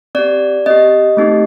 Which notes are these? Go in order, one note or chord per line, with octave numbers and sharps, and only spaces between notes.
C4 G4 D5
C4 G4 D#5
A3 C4 D#4 G4